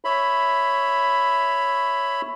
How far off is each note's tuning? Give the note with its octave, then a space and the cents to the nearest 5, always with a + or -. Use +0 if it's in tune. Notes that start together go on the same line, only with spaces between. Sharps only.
C#5 +0 E5 +0 B5 +10